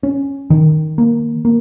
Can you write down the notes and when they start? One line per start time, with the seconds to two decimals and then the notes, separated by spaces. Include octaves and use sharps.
0.03 C#4
0.50 D#3
0.98 A#3
1.45 A#3